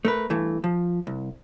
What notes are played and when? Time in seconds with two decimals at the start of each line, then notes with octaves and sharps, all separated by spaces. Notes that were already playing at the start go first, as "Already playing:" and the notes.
0.05 A3 A#4 B4
0.30 G2 E3 A3
0.64 F3
1.07 C2